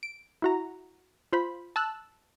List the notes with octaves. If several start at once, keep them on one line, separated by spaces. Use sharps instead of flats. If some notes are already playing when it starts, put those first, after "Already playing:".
D7
E4 F#4 A#5
F4 C5 B5
A5 E6 F#6